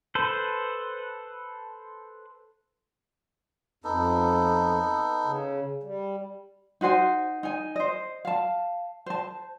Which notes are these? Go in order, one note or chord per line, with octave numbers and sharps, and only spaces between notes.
A4 B4 C5
F2 B3 D#4 A4
C#3
G3
D#4 F#4 C5 G#5
D#4 G#5
C5 D#5
F5 A5
C5 A5